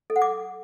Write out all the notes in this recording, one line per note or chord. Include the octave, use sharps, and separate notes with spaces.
A4
F#5
D6